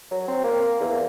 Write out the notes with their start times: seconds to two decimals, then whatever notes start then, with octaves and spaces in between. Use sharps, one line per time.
0.11 F#3
0.28 C4
0.44 A#3
0.81 E2